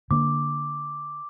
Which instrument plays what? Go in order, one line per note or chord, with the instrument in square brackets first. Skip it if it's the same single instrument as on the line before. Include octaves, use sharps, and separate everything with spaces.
[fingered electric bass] D3 A#3 [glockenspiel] D6